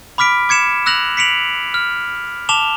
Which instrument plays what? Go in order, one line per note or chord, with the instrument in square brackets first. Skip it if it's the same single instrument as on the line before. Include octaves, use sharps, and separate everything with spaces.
[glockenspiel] B5 D6 F6 B6 D7
D6 G#6 C#7 E7
E6 F#6 A#6 F7 F#7
B6 C#7 D7 F7 F#7
F6
A5 D6 E7 F7 G7